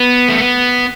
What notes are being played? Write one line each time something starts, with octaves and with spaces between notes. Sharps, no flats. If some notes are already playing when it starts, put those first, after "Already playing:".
Already playing: B3
A3
B3